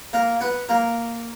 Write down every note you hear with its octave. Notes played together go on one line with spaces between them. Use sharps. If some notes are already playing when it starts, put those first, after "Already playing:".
A#3 A#4
B3 B4
A#3 A#4